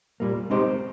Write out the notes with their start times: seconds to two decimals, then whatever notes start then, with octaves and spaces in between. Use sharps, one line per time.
0.20 A#2 G3 A#3
0.50 G#3 C4 D#4 G4 C5